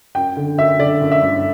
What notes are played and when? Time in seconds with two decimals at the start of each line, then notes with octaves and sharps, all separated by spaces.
0.15 F#2 G5
0.36 D3
0.58 F#2 E5
0.79 D3 D5
1.02 F#2
1.12 E5
1.22 G1